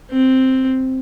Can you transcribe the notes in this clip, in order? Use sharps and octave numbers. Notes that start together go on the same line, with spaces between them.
C4